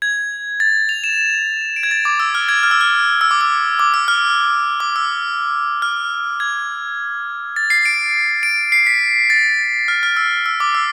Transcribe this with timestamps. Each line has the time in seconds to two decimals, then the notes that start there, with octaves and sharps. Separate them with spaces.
0.02 G#6
0.60 A6
0.89 F7
1.04 E7
1.76 D7
1.83 G#6
1.91 A6
2.05 D6
2.20 E6
2.35 F6
2.49 G#6
2.63 F6
2.71 E6
2.81 F6
3.21 E6
3.31 D6
3.41 E6
3.79 D6
3.94 E6
4.08 F6
4.80 D6
4.96 E6
5.82 F6
6.40 G#6
7.56 A6
7.70 C7
7.85 D7
8.43 D7
8.72 C7
8.87 B6
9.30 A6
9.88 F6
10.03 F6
10.17 E6
10.46 E6
10.60 D6
10.75 E6